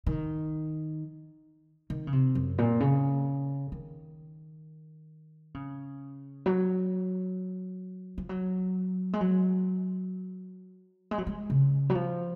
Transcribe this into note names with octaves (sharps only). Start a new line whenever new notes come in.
D#3
D#3
C#3
C3
F#2
A#2
C#3
D#3
C#3
F#3
F3
F#3
G#3
F#3
G#3
F#3
G#3
C#3
F#3
F3